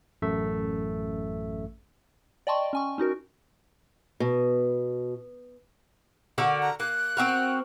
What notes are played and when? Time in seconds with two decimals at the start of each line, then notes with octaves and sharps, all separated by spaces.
0.22 A1 F#2 A3 E5
2.47 D5 D#5 G5 A5 C6 C#6
2.73 C#4 G#5 C#6
2.98 C#4 D#4 F#4 A#4
4.20 B2
6.38 D3 F#4 A#4
6.62 A#5
6.80 A#3 F#6
7.17 C4 F#4 A#4